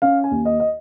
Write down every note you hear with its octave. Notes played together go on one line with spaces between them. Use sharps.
C#4 F5
G#5
D#2
D#5
D#5